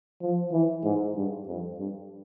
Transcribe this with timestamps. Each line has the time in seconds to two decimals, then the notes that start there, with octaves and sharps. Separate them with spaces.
0.22 F3
0.52 E3
0.84 G#2
1.16 G2
1.48 F2
1.80 G2